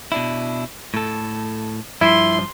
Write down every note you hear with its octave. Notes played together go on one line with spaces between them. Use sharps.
B2 D4 E4
A2 A4
G2 F3 E4 C6